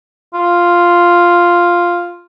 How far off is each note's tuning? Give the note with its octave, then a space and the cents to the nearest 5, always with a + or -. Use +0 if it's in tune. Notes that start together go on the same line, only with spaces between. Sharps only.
F4 +0